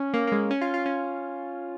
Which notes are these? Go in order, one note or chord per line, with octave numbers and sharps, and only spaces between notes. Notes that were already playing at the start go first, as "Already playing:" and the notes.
Already playing: C#4
A#3
A#3
G#3
C#4
F4
F4
C#4